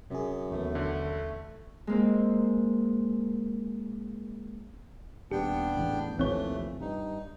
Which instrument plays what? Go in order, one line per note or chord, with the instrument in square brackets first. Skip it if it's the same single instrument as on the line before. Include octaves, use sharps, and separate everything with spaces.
[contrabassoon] F#2 [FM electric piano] C3 G#4
[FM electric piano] D#2 E3 B3 [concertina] A3
[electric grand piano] D3
[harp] G#3 A#3 C4
[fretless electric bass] D#1 [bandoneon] B3 D4 G5 [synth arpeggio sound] G4
[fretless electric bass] A1 E2
[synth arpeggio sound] A1 C4 C#5 [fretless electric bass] D#2 C3 F3 [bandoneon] E3 A3
[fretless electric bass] G2 [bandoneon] D#4